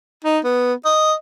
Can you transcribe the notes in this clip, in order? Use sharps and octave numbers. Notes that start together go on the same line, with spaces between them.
D#4
B3
D#5